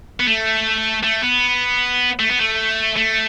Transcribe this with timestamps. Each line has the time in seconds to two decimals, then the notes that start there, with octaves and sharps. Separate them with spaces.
0.20 B3
0.27 A3
1.04 A3
1.23 B3
2.20 A3
2.30 B3
2.39 A3
2.97 A3